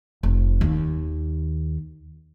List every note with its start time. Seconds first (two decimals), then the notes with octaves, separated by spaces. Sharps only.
0.23 F1
0.61 D#2